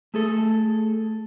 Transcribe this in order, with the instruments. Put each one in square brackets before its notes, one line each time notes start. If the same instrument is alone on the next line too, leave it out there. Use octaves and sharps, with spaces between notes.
[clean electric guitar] A3 G#4 A4